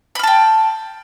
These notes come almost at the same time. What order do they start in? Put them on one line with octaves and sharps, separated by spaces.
B5 F6 A5 G5